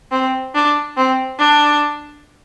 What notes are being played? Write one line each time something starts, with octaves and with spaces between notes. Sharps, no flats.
C4
D4
C4
D4